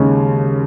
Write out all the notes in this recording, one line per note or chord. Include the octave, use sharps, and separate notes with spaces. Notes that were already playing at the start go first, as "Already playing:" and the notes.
Already playing: D#2 C#3 G#3 C#4